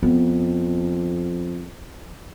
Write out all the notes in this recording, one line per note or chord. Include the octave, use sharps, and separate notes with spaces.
F2 B3